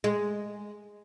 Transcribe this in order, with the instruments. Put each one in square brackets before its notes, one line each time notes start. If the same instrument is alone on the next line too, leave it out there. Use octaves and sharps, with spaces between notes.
[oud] G#3